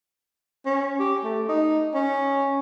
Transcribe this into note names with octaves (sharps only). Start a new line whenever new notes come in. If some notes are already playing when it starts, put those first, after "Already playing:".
C#4
G4
A3
D#4
C#4